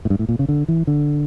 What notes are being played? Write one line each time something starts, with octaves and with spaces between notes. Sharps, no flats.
A2
G2
A2
A#2
C#3
D3
E3
D3